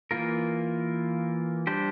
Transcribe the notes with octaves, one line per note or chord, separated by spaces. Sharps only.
E3 A#3 F4 A#4
G3 D4 G4 C5